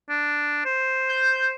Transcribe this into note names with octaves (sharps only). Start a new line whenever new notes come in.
D4
C5
G6